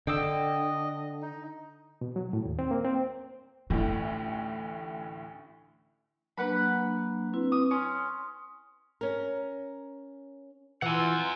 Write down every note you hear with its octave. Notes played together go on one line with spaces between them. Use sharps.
D3 D#5 G5 D6 E6
D#4
B2
F#3
A2
D#2
C4
A#3
C4
A1 D2 A2 A3 F4
F#3 A#3 D4 B4 F#5 B5
C4 E4 B4
D#6
C#4 C6 D#6
C#4 A#4
E3 F4 F#5 G#5